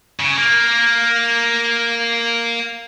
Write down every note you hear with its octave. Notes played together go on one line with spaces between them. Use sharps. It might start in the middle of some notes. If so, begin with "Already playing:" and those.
C#3
A#3